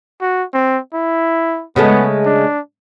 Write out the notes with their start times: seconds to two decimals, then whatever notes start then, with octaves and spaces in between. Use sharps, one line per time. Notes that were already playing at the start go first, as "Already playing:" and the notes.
0.21 F#4
0.54 C4
0.94 E4
1.76 C#3 G#3 A3 B3
2.26 D4